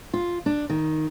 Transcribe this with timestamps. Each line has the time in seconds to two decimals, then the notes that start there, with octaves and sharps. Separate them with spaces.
0.14 F4
0.46 D4
0.70 D#3